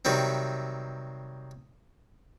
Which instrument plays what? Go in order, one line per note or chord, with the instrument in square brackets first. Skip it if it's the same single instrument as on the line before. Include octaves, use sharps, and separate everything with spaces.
[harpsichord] C3 D#3 F#3 G3 C4